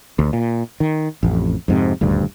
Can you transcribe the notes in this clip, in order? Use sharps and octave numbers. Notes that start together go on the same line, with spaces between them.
D2
A#2
D#3
A1 F2
F2 G#2 C3
D#1 D2 G2